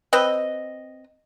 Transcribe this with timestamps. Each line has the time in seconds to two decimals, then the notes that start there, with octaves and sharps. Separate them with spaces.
0.13 C4 B4 D#5